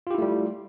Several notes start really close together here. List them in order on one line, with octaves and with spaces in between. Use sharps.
F4 G4 E4 A3 G3